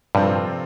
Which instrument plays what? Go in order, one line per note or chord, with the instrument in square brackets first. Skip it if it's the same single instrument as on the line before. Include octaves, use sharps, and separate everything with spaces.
[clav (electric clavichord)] G2 [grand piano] C3 F3 C4 F4 A4